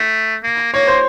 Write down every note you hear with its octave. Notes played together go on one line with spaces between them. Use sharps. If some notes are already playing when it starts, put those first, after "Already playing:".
Already playing: A3
A#3
A#3 C#5
C5